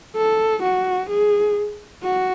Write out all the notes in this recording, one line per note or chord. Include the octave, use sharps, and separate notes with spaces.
A4
F#4
G#4
F#4